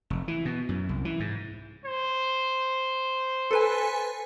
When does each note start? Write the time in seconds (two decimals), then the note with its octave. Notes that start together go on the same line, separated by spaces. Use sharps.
0.10 F1
0.28 E3
0.45 B2
0.69 F#2
0.89 C2
1.05 E3
1.20 G#2
1.85 C5
3.51 A4 B4 G#5